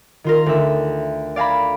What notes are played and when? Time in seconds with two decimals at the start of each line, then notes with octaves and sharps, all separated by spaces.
0.24 D#3 F4 A#4
0.46 D2 E5
1.36 D5 F5 G#5 A#5 B5